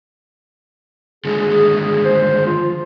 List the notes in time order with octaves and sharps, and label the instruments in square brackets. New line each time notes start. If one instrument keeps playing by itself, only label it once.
[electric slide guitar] D3 D#3 G#3 [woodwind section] G#4
[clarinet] C5
[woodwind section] F3 [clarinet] F4